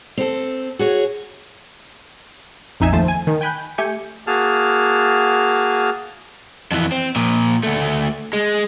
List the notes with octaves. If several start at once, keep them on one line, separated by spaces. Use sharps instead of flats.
C4 A4
F#4 G#4 C#5
A#1 F2 D#4 E5 G#5 E7
D#2 F3 A3 C5 A5
G#5
D#3
G5 G#5 B5 F#6 G6
A3 G4 G#5 G6 C#7
A#3 F#4 G#4 A5 F6
F2 E3
C4
A#2 F3
D2 A3
G#3